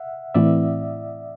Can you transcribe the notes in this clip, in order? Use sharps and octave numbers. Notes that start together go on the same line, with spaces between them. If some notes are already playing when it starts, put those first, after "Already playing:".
Already playing: E5 F#5
A2 E3 A3 C4 E4 D5 E5